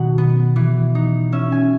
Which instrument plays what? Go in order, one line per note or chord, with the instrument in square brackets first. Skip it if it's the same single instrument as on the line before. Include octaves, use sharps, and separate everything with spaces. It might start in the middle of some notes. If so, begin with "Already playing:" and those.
Already playing: [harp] B2 D#3 F#3 F#5
B3
E3
D#4
C#4 E5
G#5